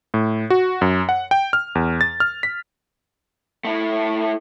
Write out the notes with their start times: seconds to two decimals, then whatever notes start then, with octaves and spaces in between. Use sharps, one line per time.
0.14 A2
0.50 F#4
0.81 F#2
1.09 F#5
1.31 G5
1.53 F6
1.75 E2
2.01 A6
2.20 F6
2.43 B6
3.65 A3 E4